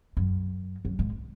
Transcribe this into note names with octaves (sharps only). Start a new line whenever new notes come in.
F#2
F#2
G#2